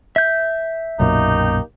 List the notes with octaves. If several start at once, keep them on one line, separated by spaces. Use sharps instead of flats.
E5 G6
B1 F#2 A#2 A#3 D#4 G4